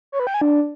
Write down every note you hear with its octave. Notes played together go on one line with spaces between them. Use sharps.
C#5
B4
G5
G#5
D4